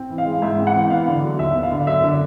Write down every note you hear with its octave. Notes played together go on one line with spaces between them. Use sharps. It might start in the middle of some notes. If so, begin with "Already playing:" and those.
Already playing: C4
E3
F5
G#3
G#2 E5
C4
F#5
E3
B3 F5
D3
F#3
D#2 E5
B3
F5
D3
F#2 E5
D3